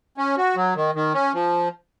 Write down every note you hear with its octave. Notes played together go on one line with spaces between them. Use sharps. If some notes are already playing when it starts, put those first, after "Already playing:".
C#4
F#4
F#3
D#3
D#3
C#4
F3